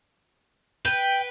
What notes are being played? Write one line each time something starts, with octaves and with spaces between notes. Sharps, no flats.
B4 G5